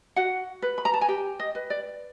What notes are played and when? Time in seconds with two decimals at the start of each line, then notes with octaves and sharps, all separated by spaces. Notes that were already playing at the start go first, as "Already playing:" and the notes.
0.16 F#4 F#5
0.62 B4
0.78 B5
0.85 A#5
0.94 A5
1.01 G#5
1.08 G4 G5
1.40 D#5
1.55 B4
1.70 D5